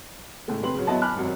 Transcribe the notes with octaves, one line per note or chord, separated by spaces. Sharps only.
A2 C#3 G#3 A3
D#1 C3 B4 C6 F#7
C#3 F#3
F#3 B3 E4 D#5 A5
G#5 A5 B5 D6 F6 F#6
G#1 F#2 C3 F#3